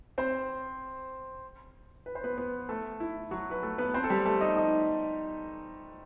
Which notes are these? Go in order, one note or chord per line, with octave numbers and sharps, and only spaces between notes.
C4 C5
B4
C5
B3 B4
B3 B4
A3 A4
E4
F#3 F#4
B4
A3 A4
B3 B4
C4 C5
A4
G3 G4
A3 A4
D#4 D#5
D#4 D#5